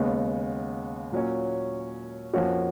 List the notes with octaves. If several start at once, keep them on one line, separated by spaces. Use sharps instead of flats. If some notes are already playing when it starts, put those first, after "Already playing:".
Already playing: D#2 C#3 G#3 B3
A#2 F#3 C#4
F2 F3 A#3 C#4 F#4